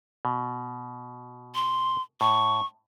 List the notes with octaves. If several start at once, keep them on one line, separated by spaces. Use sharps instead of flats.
B2
C6
A2 C#6